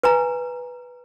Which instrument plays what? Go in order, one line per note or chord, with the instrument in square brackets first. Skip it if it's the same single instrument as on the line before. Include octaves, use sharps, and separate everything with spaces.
[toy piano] B4 G#5 A#5